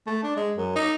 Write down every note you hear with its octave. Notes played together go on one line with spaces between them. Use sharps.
A3
D4
G#3
F#2
D#4